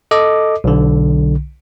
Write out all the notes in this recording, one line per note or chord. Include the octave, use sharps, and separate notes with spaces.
A4 D#5 D6
B1 D3